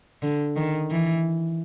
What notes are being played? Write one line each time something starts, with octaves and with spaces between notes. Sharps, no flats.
D3
D#3
E3